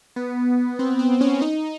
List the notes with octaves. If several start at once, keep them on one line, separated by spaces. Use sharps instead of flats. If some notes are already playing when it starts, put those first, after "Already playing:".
B3
C4
C4
C4
C#4
D#4